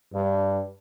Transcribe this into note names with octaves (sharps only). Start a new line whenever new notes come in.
G2